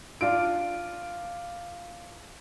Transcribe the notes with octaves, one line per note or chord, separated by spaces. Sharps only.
D4 F4 D7